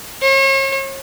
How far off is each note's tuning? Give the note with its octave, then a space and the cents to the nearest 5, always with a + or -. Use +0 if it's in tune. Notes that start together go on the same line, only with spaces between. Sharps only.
C#5 -40